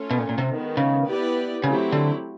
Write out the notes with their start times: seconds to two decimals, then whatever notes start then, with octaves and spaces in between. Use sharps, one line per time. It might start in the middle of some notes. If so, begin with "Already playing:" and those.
Already playing: A3 C#4 F4 A4
0.11 B2
0.19 A#2
0.29 A#2
0.38 C3
0.48 D#3 G#3 B3
0.77 C#3
1.05 B3 E4 G4 B4 D5
1.64 C#3 F#3 A3 C4 E4 G4
1.93 D3